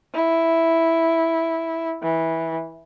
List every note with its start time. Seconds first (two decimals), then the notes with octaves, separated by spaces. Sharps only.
0.15 E4
2.02 E3